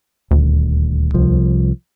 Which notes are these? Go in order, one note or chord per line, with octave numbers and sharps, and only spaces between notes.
D#1 D2
C2 F3